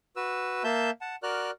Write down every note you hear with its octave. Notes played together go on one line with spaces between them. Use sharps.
F#4 B4 E6
A#3 E5 A5 G6
F#5 A5
F#4 A#4 D5 F6 F#6